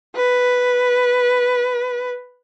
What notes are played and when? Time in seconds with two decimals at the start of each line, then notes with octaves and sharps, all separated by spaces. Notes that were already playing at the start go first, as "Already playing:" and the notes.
0.16 B4